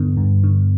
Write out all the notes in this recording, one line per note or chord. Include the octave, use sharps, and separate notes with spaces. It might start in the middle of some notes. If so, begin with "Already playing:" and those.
Already playing: G2 D3 B3
G2
D3